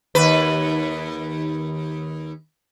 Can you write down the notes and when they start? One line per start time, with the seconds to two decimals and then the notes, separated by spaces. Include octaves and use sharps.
0.15 D#2 B4